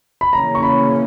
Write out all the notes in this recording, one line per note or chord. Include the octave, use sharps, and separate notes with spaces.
B5
C#3 E3 A#3 C#4 A#5
C#6
B5